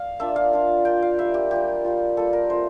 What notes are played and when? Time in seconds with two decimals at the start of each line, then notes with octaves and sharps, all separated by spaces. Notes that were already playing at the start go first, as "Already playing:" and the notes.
Already playing: D5 F5
0.19 A#3 D4 F4 E5
0.36 F5
0.53 A#3 D4 F4
0.85 A#3 D4 F4 G5
1.02 F5
1.18 G3 A#3 F4 E5
1.34 G4
1.51 G3 A#3 F4 G4
1.84 G3 A#3 F4
2.17 G3 A#3 F4 A4
2.33 A#4
2.50 A3 C4 F4 C5